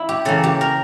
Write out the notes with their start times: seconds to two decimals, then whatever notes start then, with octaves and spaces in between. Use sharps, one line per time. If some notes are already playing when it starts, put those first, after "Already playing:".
Already playing: E4
0.09 G4
0.25 C#3 E3 A#3 A4
0.44 G4
0.61 A#4